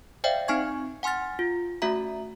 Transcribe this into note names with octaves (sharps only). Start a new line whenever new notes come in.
C5 D5 E5 F5 G5
C4 D#4 G#5 C#6 G#6
F#5 G#5 C6 F6 A6
F4
A3 C#4 F#4 E5 A#5